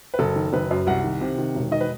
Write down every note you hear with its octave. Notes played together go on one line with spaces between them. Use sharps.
B4
F#1 A4
D#3
F#1 B4
F#2
C2 F#5
D#3
C3
D#3
E1
D#3 D#5
B4